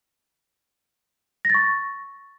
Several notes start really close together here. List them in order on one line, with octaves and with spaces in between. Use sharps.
A#6 A6 C#6